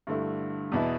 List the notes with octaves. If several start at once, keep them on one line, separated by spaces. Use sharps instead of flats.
G2 D3 A3 E4
E2 B2 B3 E4